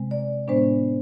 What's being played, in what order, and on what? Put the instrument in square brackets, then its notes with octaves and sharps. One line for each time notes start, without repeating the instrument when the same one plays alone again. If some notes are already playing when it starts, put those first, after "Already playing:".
Already playing: [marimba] C3 G#3 C4
D5
A2 G#3 B3 D4 C5